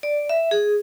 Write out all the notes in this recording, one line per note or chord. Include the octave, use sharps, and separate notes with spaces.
D5
E5
G#4